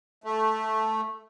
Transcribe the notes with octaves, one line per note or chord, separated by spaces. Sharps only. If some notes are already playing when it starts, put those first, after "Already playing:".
A3